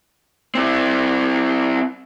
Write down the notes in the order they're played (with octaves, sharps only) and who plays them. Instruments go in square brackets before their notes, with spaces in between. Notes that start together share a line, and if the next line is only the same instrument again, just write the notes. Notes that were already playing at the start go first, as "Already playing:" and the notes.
[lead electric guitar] C4 E4